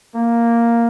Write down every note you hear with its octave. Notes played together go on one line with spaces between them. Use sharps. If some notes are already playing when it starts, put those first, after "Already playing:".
A#3